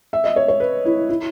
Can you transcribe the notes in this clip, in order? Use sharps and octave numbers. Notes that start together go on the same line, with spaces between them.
E5
D#5
C#5
C#5
B4
E4
E4